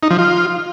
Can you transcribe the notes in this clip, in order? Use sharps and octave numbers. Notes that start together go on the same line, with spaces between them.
D#4
F3
F4